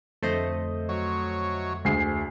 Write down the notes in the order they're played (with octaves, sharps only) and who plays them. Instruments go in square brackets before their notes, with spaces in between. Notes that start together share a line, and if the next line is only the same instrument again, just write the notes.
[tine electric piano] F2 D3 [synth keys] A3 C5 D#5
[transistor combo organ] F#3 C#5
[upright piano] D2 G#4 C7